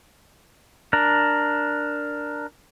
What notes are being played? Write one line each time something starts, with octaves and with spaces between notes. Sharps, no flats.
D4 A#4